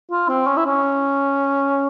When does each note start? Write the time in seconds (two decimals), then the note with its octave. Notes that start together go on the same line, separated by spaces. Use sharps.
0.11 F4
0.29 C4
0.47 C#4
0.57 E4
0.65 C#4